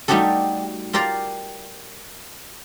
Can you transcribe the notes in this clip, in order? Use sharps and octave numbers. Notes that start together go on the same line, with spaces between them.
G3 A3 D#4 F#4 G4 A4
F4 G4 A#4 D5 F5